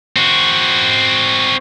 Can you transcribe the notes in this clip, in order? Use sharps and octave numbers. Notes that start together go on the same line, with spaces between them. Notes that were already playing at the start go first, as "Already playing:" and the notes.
C4 F#4